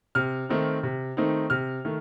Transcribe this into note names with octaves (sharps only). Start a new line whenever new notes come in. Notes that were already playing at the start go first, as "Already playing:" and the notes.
C3 F6
D#3 A3 C4 D#4
C3
D#3 A3 C4 D#4
C3 F6
D#3 A3